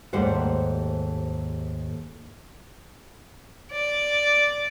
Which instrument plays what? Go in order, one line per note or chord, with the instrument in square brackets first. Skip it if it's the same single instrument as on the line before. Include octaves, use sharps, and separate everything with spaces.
[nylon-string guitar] D#2 G#2 G3 A3 C5 F#5
[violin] D5